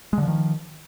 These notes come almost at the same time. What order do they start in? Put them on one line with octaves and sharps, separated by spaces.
G#3 D3 F3 D#3